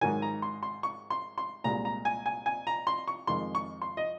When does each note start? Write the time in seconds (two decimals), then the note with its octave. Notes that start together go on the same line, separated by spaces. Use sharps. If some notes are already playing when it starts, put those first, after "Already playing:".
0.01 G#2 D#3 F#3 G#5
0.22 A#5
0.42 C6
0.63 C6
0.83 C#6
1.10 C6
1.38 C6
1.64 C2 A#2 G#3 A#5
1.85 A#5
2.05 G#5
2.26 G#5
2.46 G#5
2.67 A#5
2.87 C6
3.08 C#6
3.27 F2 D#3 G#3 C6
3.55 C#6
3.82 C6
3.97 D#5